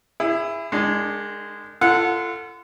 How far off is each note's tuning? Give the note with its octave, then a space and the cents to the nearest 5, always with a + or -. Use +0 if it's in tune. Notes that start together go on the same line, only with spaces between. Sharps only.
E4 +15 G#4 -30
D#3 -35 G#3 -10 D4 +0
F4 -30 A4 +15 F#5 -20